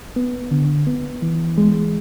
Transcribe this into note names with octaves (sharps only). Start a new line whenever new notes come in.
B3
D3
B3
E3
G#3